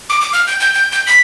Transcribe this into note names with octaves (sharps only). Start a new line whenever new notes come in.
D6
D6
F6
G6
G6
G6
G6
B6